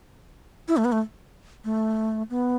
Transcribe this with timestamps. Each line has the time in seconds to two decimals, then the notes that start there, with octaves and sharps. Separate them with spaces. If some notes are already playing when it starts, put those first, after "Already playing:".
0.68 E4
0.77 A3
0.85 B3
0.92 A3
1.65 A3
2.30 B3